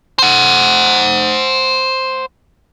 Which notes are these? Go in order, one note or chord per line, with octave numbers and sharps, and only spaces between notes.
C5 F#5